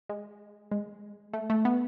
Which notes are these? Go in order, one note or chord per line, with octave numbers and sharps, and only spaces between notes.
G#3
G#3
A3
A3
B3